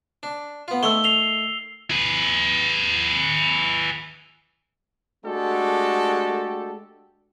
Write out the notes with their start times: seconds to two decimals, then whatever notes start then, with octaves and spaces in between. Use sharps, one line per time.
0.23 D4
0.68 B3 F4
0.83 D#3 A3 C#5 E6 G7
1.04 C7 F7 G7
1.91 G#4 B4
5.25 G#3 A3 D4 F#4 G4 A4